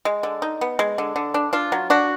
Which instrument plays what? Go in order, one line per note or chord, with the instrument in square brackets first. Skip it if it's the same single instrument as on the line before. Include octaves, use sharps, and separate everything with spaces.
[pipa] G#3
D3
D#4
B3
G#3
D3
D3
D4
D4 F4
F#3
D4 F#4